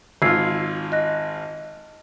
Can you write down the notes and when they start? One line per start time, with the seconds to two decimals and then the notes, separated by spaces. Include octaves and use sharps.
0.22 G#1 F4 E6 G#6 C7
0.92 D#5 F#6 A#6